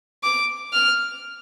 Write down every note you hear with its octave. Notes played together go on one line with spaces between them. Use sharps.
D6
F6